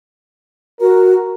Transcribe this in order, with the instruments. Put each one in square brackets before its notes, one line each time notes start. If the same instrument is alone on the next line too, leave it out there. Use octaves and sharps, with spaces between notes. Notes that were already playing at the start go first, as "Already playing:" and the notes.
[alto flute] F#4 [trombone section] A#4